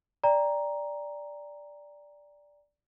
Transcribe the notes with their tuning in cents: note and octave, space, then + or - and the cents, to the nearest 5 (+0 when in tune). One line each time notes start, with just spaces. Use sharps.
D5 -5 G5 +35 A#5 +0